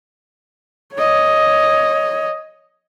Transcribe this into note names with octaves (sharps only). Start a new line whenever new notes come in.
C#5 D#5